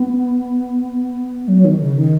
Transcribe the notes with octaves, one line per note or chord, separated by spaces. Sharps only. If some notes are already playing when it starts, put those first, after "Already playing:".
Already playing: B3
F#3
D#3
C#3
D#3